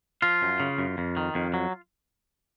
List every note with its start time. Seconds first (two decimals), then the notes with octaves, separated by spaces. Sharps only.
0.22 F3 F4
0.42 F#2
0.60 C#3
0.78 F#2
0.98 F2
1.17 D#3
1.35 F2
1.54 F#3